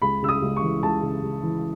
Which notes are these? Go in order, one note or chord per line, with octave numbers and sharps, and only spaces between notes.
C#2 B5
C#3 E6
D#6
C#2
C#6
E3
C#2 A5
C#3
C#2
E3